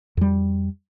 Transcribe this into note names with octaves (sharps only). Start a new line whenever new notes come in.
F2 G3